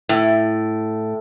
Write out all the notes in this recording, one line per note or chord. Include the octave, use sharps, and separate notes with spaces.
A2